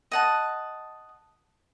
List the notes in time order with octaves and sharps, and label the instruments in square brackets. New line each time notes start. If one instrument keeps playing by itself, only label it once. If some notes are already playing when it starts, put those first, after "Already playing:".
[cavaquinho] D#5 F#5 A5